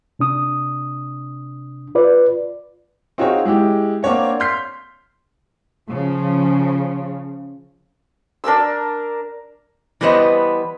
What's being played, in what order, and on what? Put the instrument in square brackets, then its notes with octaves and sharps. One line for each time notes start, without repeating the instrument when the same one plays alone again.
[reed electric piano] C3 D4 D#6
F4 B4 D5
[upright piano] C4 D#4 F4 F#4 G#4 C#5
G#3 E4 G4
A#3 C4 D4 C#5 F#5
C6 F6 G6 B6 C7
[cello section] C#3 F3
[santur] D4 A#4 D6 E6
[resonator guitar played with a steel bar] E3 G3 B3 B4 C5 D#5